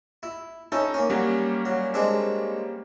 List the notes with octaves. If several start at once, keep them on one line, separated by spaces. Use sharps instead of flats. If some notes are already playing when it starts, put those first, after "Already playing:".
E4
C#4 D#4 E4 A4
A#3 C#4
F#3 G3 A#3 C#4
F#3
G#3 C4 D4